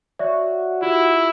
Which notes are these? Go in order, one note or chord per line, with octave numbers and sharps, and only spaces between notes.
F#4 C#5 D5 E5
E4 F4 G4